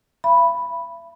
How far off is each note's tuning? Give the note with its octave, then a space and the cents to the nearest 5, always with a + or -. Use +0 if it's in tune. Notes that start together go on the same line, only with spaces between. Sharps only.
E5 +45 B5 +0